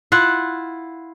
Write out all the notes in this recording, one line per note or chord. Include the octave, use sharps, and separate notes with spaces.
E4 F4 F#5